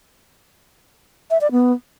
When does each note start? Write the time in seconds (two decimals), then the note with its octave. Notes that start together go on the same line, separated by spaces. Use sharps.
1.31 E5
1.41 D5
1.52 B3